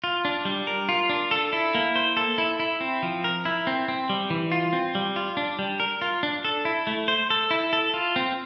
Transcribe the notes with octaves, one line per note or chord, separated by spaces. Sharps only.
F4
D4
G3
A#4
F4
D4
A4
E4
A#3
C5
A4
E4
E4
C4
F3
A#4
E4
C4
C4
G3
E3
F4
C4
G3
F4
D4
G3
A#4
F4
D4
A4
E4
A3
C5
A4
E4
A4
F4
C4